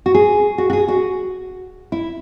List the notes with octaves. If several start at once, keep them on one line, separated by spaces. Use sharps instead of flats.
F#4
G#4
F#4
F#4
G#4
F#4
E4